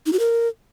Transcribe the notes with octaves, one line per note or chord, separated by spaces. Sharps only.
D#4
F#4
A#4